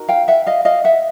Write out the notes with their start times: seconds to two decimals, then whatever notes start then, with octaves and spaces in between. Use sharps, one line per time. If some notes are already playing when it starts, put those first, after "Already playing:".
Already playing: D#4 F#4 A#4
0.08 F5 G5
0.28 E5 F#5
0.47 D#5 F5
0.65 D#5 F5
0.84 E5 F#5